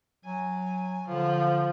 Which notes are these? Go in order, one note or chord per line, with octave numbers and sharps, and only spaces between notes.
F#3 G#5
D3 F3